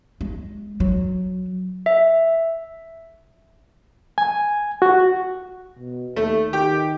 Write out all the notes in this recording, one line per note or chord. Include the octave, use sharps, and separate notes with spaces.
G#3
F#3
E5
G#5
F#4
B2
D#2 A3
D#3 G4